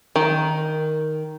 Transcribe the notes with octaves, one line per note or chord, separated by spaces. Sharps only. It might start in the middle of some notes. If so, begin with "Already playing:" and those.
D#3